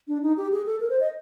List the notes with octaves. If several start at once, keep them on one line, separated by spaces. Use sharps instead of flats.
D4
D#4
G4
G#4
A4
A#4
C5
D#5